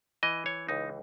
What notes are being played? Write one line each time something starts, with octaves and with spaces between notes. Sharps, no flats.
E3 D#5
C#5
C#2 D#4